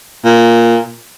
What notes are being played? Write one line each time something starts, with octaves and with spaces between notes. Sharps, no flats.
A#2